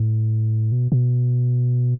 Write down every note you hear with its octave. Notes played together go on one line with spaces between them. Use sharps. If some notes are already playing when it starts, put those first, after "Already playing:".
Already playing: A2
B2
B2